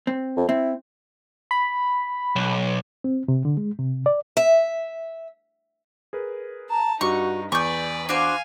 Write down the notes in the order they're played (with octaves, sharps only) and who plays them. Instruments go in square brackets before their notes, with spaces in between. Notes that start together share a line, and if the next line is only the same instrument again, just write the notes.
[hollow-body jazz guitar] C4
[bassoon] F2
[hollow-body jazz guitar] C4 [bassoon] E4
[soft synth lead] B5
[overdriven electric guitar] B1
[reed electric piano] C4
C3
D3
G#3
C3
D5
[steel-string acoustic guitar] E5
[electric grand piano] G#4 A#4 B4
[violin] A5 [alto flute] A#5
[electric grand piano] G2 [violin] D#4 [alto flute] F#4 [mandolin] C#6
[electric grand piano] E2 [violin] B4 D5 [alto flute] G#5 [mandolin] C#6 G6
[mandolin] D4 F#4 C5 [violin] F5 G#5